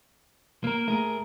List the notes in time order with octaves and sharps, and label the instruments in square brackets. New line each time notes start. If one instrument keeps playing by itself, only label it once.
[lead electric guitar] A#3 A#4
[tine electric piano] A3 [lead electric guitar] G#4 A#4